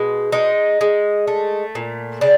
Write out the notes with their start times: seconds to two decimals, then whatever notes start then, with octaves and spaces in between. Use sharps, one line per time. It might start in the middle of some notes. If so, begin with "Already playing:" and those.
Already playing: B2 G#3
0.32 G#3 D#4
0.81 G#3
1.28 A3
1.75 A#2
2.21 C#3 D4